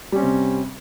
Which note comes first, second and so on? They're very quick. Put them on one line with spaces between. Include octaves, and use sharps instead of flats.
G3 C#4 C4 C3